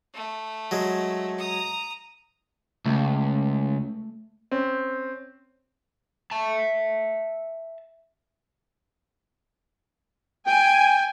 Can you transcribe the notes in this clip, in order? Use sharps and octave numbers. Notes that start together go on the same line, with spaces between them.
A3
F#3 G#3
A#5 D#6
C#2 A3
C4 C#4
E5 A5
G5 G#5